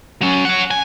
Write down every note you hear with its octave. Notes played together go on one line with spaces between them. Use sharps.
F#3 C#4
C#5 F#5
G#5